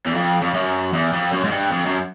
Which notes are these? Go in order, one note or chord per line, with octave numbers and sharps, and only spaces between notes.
E2
F2
F2
F#2
E2
F2
F#2
G#2
G2
F2
F#2